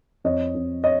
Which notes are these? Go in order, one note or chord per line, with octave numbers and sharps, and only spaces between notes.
F2 C#5 D#5
F2
C#5 D#5